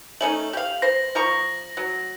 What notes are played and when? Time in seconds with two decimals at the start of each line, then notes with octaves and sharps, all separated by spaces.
0.21 A3 C#4 D#4 F#7
0.53 G4 F5
0.82 C5 A#6
1.15 F3 A#5 C#6
1.77 F#3